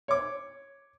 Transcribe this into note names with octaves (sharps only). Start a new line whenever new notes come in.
C#5 D6